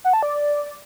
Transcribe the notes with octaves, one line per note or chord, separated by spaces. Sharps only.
F#5
A5
D5